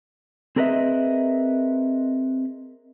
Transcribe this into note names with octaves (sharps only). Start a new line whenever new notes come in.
C4 G#4 A#4 B4 D#5 E5